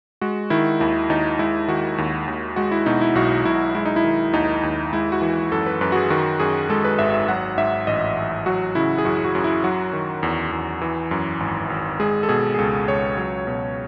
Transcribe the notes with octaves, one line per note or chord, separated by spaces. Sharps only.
G#3 F#4
D#3 E4
D#2 E4
D#2 D#4
G#3 E4
D#3 F#4
D#2
D#2
G#3 F#4
E4
B2 D#4
E4
B1 F#4
B1 E4
G#3 E4
D#4
E4
D#3
D#2 D#4
D#2
G#3 E4
F#4
E3
F#2 A4
B4
F#2 B4
F#4
G#4
D#3 F#4
F#2 G#4
G#3 A4
B4
G#1 E5
E5
F#3 F#5
G#2 E5
A1 D#5
A1
F#3 F#4
C#3 E4
G#4
F#2 F#4
F#4
F#2
E4
F#3 F#4
D#3
E2
E2
E3
F#2
G#1
G#1
G#3 G#4
A4
B2 G#4
G#4
C#2 A4
C#2 C#5
F#3
B2